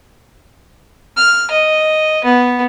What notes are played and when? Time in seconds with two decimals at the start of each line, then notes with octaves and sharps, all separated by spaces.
1.17 F6
1.51 D#5
2.24 B3